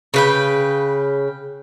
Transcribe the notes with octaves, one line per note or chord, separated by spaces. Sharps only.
C#3 B4 G5